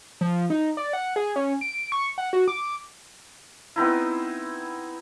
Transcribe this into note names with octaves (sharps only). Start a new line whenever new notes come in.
F3
D#4
D5
F#5
G#4
C#4
D7
C#6
F#5
F#4
D6
B3 C4 D#4 E4